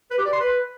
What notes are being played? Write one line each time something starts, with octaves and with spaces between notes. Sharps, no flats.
B4
G4
D5
C6
B4